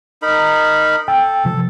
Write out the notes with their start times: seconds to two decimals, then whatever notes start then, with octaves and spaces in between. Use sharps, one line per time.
0.22 D#4 A#4 B5
1.08 A4 G5
1.45 C3 F3